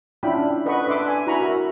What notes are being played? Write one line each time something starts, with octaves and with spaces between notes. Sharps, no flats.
C#4 D4 E4 F4 G5 B5
A4 B4 D#5 F#5 B5 C#6
D4 B4 E5 C6 D6
G#5
E4 F#4 G#5 A#5 B5 C#6
F#4 A#4 E5